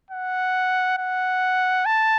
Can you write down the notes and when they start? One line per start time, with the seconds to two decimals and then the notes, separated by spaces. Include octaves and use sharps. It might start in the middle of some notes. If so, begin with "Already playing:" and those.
0.11 F#5
0.98 F#5
1.86 A5